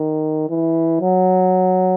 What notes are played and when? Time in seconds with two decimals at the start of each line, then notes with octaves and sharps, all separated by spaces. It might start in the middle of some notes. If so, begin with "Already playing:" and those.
Already playing: D#3
0.49 E3
1.01 F#3